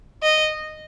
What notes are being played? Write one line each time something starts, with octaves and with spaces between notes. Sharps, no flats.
D#5